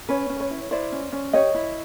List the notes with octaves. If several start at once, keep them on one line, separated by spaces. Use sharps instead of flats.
C#4 B4 C#5
C#4
B4 C#5
E4
E4 C5 D5
C#4
C#4
G4 C#5 D#5
E4